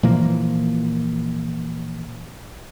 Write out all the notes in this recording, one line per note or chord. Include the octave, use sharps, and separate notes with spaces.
A#2 E3 F3 A#3